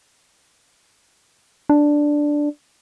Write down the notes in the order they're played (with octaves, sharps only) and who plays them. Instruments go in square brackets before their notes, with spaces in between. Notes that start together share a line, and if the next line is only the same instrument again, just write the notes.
[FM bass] D4